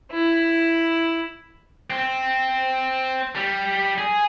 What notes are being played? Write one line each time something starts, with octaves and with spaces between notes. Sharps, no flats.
E4
C4
G3
G#4